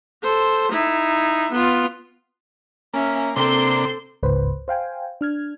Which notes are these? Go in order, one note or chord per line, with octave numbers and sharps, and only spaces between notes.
A4 C5
D#4 E4
B3 F4
A#3 C#4 E5
C3 A#3 C4 D4 A4 C6
G1 C#2 G#2 B4 C5
C5 F5 G5 G#5
D4 F6 G#6